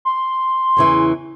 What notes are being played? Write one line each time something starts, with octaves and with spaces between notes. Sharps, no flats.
C6
E2 C#3 E3